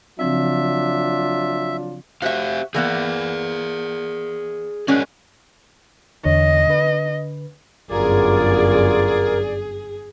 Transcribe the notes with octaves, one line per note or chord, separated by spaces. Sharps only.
C#3 F3 F#3 C4 D4 F4 E5
F#4 G4 C5 E5 F5
E3 A#3 B3 G#4 D5
F#3 G#3 C#4 G#4 A#4 D5
E2 D3 C#5 D#5
D3 B4
G1 F#2 F4 G#4 A#4 D5